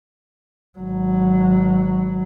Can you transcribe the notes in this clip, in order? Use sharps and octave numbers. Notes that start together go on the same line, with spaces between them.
G#1 F#3